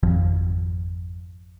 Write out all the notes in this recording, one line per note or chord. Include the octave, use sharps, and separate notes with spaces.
G#1 F2 F3